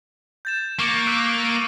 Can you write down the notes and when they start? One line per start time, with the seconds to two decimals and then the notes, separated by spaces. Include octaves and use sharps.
0.45 G6 A6 E7
0.79 A#3 C#6 D6 C#7
1.07 E6 F#6 B6
1.45 D#7